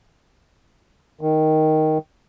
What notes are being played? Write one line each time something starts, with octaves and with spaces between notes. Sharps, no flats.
D#3